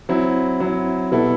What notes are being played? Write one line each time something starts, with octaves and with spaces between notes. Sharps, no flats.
F#3 C4 E4
F#3 C4 E4
B2 G3 B3 E4 A4